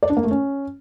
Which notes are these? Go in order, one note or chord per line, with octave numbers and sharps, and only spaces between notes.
D5
D4
A#3
A3
C#4